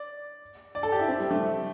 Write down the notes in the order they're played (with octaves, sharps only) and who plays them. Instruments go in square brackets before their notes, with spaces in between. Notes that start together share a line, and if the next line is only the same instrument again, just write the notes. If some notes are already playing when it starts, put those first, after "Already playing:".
Already playing: [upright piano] D5
D5
A4
G4
E4
C4
G3
A3